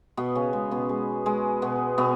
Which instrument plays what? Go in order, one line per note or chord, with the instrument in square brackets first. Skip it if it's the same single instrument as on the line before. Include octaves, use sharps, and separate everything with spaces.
[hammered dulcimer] B2 B3
C#3 C#4
G#3
B2 B3
G#3
G#3
B2 B3
B2 B3